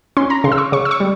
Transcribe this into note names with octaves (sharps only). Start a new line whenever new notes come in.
C#4 C6
A#5
C#3 C6
E6
C#6
C#3 C#6
E6
C#6
G3